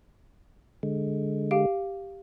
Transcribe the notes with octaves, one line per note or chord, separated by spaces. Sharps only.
D3 G#3
G4 F5 D7